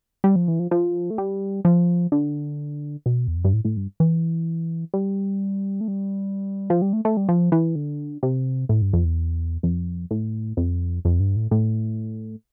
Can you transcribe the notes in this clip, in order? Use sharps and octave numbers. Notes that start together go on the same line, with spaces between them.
G3
F3
E3
F3
F3
A3
G3
F3
D3
B2
E2
F2
G2
A2
A2
G2
E3
G3
A3
G3
F3
G3
A3
A3
G3
F3
E3
D3
C3
A2
G2
F2
E2
F2
A2
F2
F2
G2
A2
A2